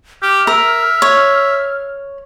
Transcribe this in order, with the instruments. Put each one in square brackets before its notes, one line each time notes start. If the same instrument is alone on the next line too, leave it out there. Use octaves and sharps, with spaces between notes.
[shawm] G4 [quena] F6
[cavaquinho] A#4 [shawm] E5
[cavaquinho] C#5